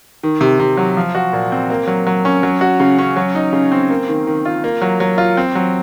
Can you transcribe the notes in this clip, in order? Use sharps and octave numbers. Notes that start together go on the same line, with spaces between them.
D#3
C3
C3
F#3
F3
F#4
A#2
C4
A#3
F#3
F#3
C#4
F#3
F#4
C#3
C#4
F#3
D#4
C#3
C4
A#3
D#3
D#3
F4
A#3
F#3
F#3
F4
C4
F#3